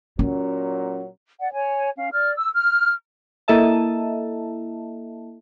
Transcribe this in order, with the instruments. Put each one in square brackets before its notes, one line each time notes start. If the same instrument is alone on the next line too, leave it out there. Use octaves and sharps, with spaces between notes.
[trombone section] A#2 F#3 [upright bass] C#4
[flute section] D5 F#5
C#5 G#5
C#4 F5
D5 F6
E6
F6
[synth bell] A#3 E4 A4 D#5 E5 A5